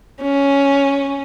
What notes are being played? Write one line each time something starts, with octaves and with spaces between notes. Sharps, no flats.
C#4